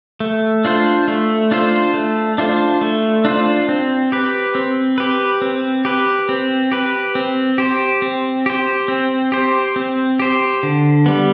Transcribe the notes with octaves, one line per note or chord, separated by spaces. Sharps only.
A3
D4 F4 C5
A3
D4 F4 C5
A3
D4 F4 C5
A3
D4 F4 C5
C4
G4 B4
C4
G4 B4
C4
G4 B4
C4
G4 B4
C4
G4 C5
C4
G4 C5
C4
G4 C5
C4
G4 C5
D3
G3 B3